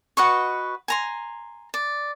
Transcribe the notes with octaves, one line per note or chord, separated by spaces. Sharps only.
F#4 B4 D#5 C#6
G#5 A#5 C6
D5